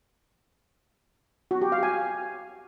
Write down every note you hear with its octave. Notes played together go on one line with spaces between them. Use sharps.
F#4
G4
F5
G#5